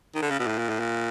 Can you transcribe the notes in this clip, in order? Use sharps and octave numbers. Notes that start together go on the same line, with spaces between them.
D#3
D3
C#3
B2
A2
A#2
A2
A#2